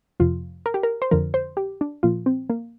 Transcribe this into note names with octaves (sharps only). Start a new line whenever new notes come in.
F2 C3 F3 F4
A#4
G4
A#4
C5
F2 D3 F3 A#4
C5
G4
D4
A#2 F3 F4
C4
A#3